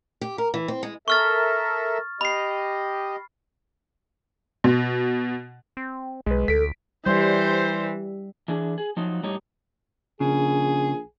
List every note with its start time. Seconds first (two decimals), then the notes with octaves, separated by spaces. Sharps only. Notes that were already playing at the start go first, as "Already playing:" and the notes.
0.21 G4
0.38 A#4
0.54 E3
0.68 C4
0.83 G#3
1.08 A4 A#4 E5 C#6 F6 A6
2.21 G4 D#5 B5 C7
4.64 B2
5.77 C4
6.26 B1 G#3 B4
6.48 D2 A4 B6 D7
7.06 E3 G3 C5
8.48 E3 D4 G#4
8.78 G#4
8.97 F3 F#3 D#4
9.23 A2 G3 D#4 G4 C#5
10.20 A#1 C#3 G#4